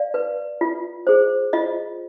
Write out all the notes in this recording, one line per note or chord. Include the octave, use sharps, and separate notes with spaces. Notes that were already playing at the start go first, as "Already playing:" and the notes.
Already playing: D5 F5
B4
F4
G#4 C5
F4 D#5